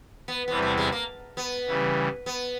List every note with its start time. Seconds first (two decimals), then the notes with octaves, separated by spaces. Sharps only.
0.28 B3
0.48 E2 C3 E3 G3 B3
0.62 A3
0.77 G#3
0.92 A#3
1.37 B3
1.67 C#3 E3 G3
2.26 B3